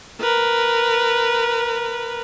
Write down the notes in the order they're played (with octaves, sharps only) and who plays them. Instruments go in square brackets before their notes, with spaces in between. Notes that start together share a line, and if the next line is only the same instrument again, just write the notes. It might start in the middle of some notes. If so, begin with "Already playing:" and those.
[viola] A#4 B4